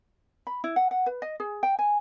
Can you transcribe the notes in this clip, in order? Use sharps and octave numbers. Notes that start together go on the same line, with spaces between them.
B5
E4
F#5
F#5
B4
D#5
G#4
G5
G#5